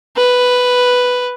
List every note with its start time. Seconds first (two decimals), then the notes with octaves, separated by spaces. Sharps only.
0.17 B4